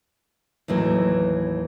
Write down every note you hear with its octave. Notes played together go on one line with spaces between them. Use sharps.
D#2 A2 E3 F#3